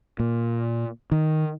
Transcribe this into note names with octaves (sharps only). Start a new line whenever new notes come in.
A#2
D#3